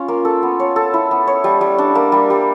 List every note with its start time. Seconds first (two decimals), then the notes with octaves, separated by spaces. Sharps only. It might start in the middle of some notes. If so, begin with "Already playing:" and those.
Already playing: C#4 F4
0.08 A#3
0.25 A4
0.43 B3
0.60 C#5
0.76 A4
0.94 E4
1.11 B3
1.27 C#5
1.44 G3
1.61 G3
1.78 D4
1.95 A#3
2.12 G3
2.30 G3